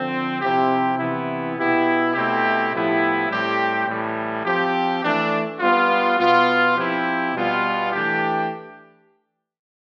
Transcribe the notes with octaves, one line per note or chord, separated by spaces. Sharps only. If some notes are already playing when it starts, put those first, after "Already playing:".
Already playing: D3 F3 C4
C3 F3 C4 E4 G4
C3 E3 B3 E4
B2 B3 E4 G4
B2 A3 C4 E4 G4
A2 F3 B3 E4 G4
A2 G3 C4 G4
A2 E3 G3
F3 C4 G4
E3 A3 D4
G3 B3 F4
B2 B3 F4
F3 C4 E4 G4
B2 G3 B3 F4
E3 A3 D4 G4